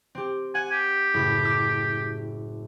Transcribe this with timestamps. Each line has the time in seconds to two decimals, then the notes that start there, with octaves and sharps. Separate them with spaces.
0.15 C4 G4
0.55 F#5 G#5
0.72 G4
1.14 F#1 A2 B5
1.44 D6 E6